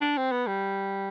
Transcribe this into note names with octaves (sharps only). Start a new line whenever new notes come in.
D4
C4
B3
G3